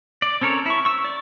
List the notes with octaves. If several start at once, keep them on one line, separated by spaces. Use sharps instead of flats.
D5
C4 C#4 A4 A#4 C#5
E4 C#6
C#6 E6
D5